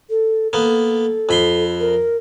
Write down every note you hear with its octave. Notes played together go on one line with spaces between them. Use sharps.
A4
A#3 B3 A4
F2 B5 C6
A#4